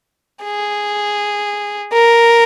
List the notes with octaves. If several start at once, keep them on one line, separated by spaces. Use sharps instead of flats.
G#4
A#4